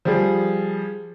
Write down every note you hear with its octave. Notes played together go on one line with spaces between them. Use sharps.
F3 G3 G#4